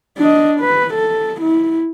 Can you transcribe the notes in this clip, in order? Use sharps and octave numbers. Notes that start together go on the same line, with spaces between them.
D4 D#5
B4
A4
E4